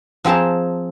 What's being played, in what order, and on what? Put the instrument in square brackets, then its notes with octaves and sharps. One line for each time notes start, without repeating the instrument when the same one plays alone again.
[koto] F3 C4 G#4 A5 A#5